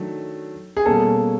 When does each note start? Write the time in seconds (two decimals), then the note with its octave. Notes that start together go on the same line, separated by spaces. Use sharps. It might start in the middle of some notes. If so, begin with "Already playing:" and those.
Already playing: D#3 F#3 A3 D4
0.77 G#4
0.85 B2 G3 A#3 C#4 A4